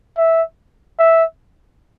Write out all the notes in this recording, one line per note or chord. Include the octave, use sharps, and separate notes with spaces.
E5
E5